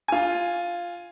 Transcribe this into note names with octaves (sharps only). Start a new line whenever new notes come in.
F4 G#5